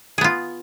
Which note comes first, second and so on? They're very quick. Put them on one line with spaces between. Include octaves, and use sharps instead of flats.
G#4 B3 F4